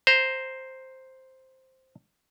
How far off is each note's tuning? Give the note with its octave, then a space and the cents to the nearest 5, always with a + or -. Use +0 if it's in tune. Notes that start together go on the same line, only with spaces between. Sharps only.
C5 +0 A#5 +0